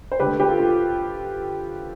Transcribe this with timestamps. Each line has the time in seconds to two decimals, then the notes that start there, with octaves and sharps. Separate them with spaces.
0.12 C5
0.20 D3 A3 G4 B4
0.40 G4 B4
0.49 F4 A4
0.59 F4